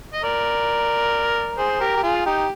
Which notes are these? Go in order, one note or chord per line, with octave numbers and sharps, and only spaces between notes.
D#5
A#4 D5
G#4 C5
G4 A#4
G4
F4 G#4
D#4 G4